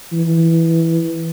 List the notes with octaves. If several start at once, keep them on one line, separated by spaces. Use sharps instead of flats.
E3